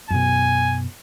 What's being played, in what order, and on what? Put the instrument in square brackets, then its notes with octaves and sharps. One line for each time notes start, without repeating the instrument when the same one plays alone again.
[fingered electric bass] F#2 B2 [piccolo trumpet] G#5